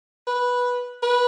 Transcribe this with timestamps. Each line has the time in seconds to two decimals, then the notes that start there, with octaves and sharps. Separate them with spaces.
0.27 B4
1.03 B4